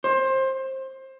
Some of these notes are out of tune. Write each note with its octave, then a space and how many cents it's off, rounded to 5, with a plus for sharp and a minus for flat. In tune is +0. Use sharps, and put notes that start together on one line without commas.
C5 +20